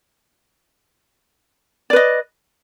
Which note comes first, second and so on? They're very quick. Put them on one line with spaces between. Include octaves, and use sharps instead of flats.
D5 B4 D#5